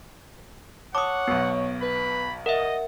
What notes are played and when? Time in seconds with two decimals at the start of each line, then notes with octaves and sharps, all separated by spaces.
0.95 C#5 F#5 A5 D6 D#6
1.27 B1 B2 B3
1.82 B4 B5
2.46 A#4 D#5 E5 F#5